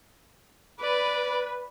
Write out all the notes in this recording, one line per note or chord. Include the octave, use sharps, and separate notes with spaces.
B4 D5